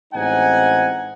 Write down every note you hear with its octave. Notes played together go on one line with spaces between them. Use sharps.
A1 G#3 C4 D#4 F#5 G#5